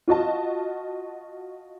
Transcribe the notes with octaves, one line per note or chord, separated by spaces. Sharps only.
F4 F#4 D#5 A5